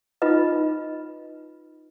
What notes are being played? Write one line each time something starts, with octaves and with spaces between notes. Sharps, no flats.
D#4 F4 B4 D#5